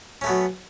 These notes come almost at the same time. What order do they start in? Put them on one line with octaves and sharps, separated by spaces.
C#4 A3 B3 F#3